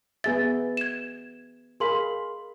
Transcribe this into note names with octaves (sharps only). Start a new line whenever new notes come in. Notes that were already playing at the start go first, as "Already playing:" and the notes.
B3 G#4 E5 A6
G#6 E7
G#4 A#4 F5 B5 C6 F#7